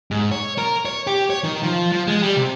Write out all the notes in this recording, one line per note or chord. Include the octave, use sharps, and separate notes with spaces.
G#2
C#5
A#4
C#5
G4
C#5
D#3
F3
F3
G#3
G3
C3